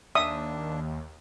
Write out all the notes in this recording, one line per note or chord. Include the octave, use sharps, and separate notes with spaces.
D#2 D4 E5 D#6